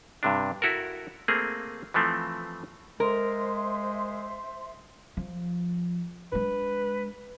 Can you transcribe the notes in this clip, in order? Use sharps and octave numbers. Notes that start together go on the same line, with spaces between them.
G2 C3 D4
E4 F#4 A4 A#4
A3 A#3 C4 G#4
E3 F3 A3 C4
G#3 A#4 C5 E5 C6
F3
G#3 D4 B4